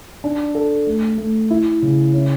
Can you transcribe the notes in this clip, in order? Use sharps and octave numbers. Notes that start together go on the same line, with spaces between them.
D4
A4
A3
A3
E4
C#3
C#4